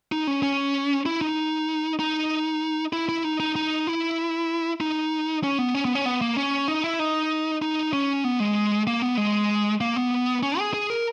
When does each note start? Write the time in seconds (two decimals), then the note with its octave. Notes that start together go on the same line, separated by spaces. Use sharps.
0.12 D#4
0.27 C#4
0.43 C#4
1.06 E4
1.21 D#4
1.99 D#4
2.93 E4
3.09 E4
3.24 D#4
3.40 D#4
3.56 D#4
3.87 E4
4.81 D#4
5.43 C#4
5.59 B3
5.75 C#4
5.85 B3
5.95 C#4
6.06 B3
6.21 A#3
6.37 C#4
6.68 D#4
6.84 E4
6.99 D#4
7.62 D#4
7.93 C#4
8.24 B3
8.40 G#3
8.87 A#3
9.02 B3
9.17 G#3
9.81 A#3
9.96 B3
10.43 C#4
10.59 G#4
10.74 G#4
10.90 A#4